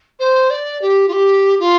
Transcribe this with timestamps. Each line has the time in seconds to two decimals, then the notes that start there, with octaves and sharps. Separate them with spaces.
0.19 C5
0.50 D5
0.82 G4
1.08 F4
1.13 G4
1.59 F4